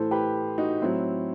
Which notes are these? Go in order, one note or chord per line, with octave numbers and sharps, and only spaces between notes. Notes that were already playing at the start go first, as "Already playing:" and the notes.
Already playing: A2 E3 A4 C5
G4 B4
D#4 F#4
A2 F#3 C4 E4